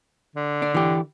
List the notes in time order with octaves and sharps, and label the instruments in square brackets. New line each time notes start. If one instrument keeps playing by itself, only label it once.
[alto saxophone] D3
[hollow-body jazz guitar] D4
E3 G4